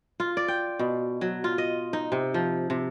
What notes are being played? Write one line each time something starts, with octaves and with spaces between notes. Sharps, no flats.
F4
D5
G5
B2
F#3
F4
D#5
D#4
C3
F3
C3